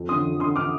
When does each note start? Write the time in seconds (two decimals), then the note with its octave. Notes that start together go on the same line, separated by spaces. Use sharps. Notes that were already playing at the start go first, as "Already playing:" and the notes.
Already playing: F2
0.09 D3 C6 D#6
0.26 F2
0.40 D3 C6 D#6
0.56 D3 D6 F6